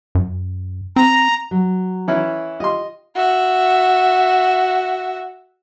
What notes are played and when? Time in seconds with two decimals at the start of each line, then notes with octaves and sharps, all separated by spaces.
0.15 F#2
0.96 C4 A#5
1.51 F#3
2.08 E3 C#4 E4
2.60 F4 G4 D#5 C6
3.15 F#4 E5